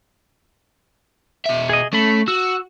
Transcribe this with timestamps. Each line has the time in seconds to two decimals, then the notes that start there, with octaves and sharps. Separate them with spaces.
1.46 B2 E5
1.69 G#4 D#5
1.93 A3 C#4 A4 B5
2.28 F#4 E6